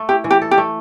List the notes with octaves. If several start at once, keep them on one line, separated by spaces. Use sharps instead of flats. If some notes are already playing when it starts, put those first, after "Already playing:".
Already playing: A3 A4
E4 G4
E3
G4
A4
G4
A3